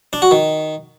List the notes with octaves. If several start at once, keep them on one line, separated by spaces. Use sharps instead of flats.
D4
F#4
D#3